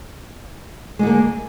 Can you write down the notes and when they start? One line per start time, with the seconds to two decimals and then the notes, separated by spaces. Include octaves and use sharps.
0.99 G#3
1.03 D3
1.07 A#3